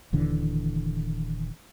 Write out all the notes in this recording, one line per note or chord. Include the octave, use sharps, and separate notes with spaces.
D#1 D#2 D3 E3